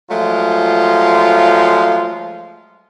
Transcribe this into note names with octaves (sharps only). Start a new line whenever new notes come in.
F3 F#3 G#3 A3 F4